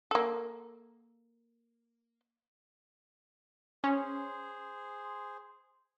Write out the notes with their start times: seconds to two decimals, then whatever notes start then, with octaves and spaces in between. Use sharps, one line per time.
0.11 A#3 A4
3.84 C#4 G#4 C5